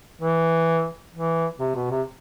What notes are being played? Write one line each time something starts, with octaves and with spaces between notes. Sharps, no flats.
E3
E3
C3
B2
C3